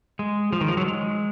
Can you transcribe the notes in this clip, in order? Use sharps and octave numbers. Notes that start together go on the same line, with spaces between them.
G#3
F3
D#3
F3
F#3
G#3